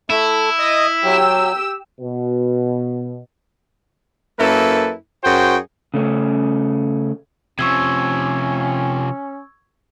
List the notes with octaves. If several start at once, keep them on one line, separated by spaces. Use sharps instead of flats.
A3 E4
D#5 D#6
F#3 G4 E6
B2
F#2 A#3 E4 A4 B4
F#2 F#4 G#4 C5 G5
C#3 A3 C#4
C3 F3 C#4 C#6 E6 G#6